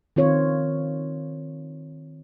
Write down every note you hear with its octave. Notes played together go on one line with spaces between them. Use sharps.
D#3 C4 F4 C#5